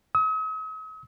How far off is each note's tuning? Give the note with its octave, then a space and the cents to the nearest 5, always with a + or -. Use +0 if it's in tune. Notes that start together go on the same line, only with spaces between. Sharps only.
D#6 +45